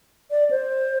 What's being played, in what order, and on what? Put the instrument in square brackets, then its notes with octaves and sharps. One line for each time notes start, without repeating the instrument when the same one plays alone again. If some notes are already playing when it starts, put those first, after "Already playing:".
[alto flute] D5
C5